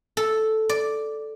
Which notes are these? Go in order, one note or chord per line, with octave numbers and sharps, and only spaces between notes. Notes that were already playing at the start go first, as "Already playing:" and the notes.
A4
D5